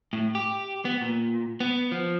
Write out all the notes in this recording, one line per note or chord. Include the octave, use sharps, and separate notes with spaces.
A2
G4
B3
A#2
B3
F3